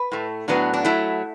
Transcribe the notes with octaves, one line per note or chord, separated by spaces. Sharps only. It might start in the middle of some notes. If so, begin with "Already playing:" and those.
Already playing: B4
A2 A3
A2 F#3 B3 D4
D4
F#3 A3 E4